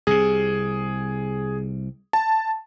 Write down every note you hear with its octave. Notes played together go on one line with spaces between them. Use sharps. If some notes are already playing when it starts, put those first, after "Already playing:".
C2 C3 G#4
A5